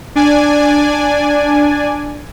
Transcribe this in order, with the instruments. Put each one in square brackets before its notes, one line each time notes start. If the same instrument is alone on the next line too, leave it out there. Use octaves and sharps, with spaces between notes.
[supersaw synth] D4 D5 G#5